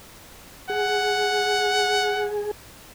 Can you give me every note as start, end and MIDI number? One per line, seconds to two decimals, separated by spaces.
0.70 2.51 68
0.70 2.30 78